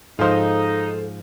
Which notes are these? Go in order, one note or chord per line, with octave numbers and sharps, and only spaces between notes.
G#2 F3 D#4 F4 A4 C5